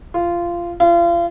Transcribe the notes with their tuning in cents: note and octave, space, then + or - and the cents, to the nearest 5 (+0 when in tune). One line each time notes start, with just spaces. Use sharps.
F4 -15
F4 -35